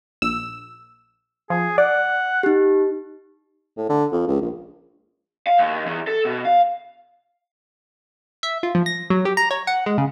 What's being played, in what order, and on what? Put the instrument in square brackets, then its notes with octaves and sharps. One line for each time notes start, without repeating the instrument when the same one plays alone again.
[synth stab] A#1 E6
[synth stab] F3 [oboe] G#4
[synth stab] D5 [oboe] F#5
[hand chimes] D#4 G4
[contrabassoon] A2
D3
F2
C#2
A#1
[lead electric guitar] F5
D#2
E2
A4
B2
F5
[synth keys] E5
F4
F3
A#6
F#3
G4
A#5
C#5
F#5
G#3
C#3